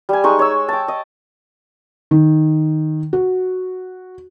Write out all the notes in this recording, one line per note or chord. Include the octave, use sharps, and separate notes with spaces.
G3 G#5
G#3 D#4 C#6
C#5 E6
G5 A5
D#5
D#3
F#4